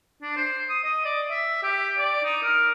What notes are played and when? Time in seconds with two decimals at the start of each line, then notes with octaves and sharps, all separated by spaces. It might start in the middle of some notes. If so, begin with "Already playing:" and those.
0.22 D4
0.37 C5
0.69 D#6
0.84 D#5
1.05 D5
1.30 E5
1.63 G4
1.98 D5
2.24 D#4
2.43 A#4